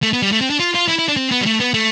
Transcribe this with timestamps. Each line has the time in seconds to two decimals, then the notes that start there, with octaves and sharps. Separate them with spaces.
0.03 A3
0.13 B3
0.22 G3
0.32 A3
0.41 C4
0.50 D4
0.60 F4
0.74 F4
0.88 E4
0.99 E4
1.08 D4
1.17 C4
1.31 B3
1.41 G3
1.46 A3
1.60 B3
1.74 A3